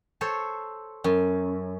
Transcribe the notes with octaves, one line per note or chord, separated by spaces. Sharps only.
A4 C5 C#5
F#2